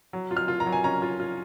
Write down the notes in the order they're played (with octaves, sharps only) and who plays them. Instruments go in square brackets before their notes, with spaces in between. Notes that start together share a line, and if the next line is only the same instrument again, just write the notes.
[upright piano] F#3
F4
F6
F4
A#5
F#3
G#5
C#4 A#5
F4
F4